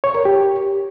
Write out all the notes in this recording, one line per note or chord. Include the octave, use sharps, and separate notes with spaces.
C#5
A#4
G4